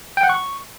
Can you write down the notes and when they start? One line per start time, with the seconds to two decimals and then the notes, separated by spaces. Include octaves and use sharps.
0.17 G5
0.23 F#5
0.29 C#6